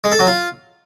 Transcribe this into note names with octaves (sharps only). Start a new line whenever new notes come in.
G#3
A4
F#3
F4